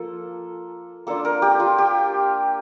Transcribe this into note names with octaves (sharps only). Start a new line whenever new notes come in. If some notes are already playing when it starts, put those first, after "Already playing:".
Already playing: F3 A#3 F4 A4
A#3 D4 F4 A4
A#4
G4
F4
G4